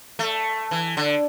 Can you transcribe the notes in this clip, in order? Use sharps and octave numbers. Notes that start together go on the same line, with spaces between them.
A3
E3
D3